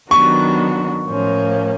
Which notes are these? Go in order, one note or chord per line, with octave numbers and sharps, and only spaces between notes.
D#3 F#3 B3 D4 F#4 C#6
A2 F3 A#3 C#4